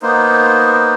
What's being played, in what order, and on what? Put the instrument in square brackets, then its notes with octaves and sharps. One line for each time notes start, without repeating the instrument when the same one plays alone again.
[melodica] A#3 B3 D#4 C5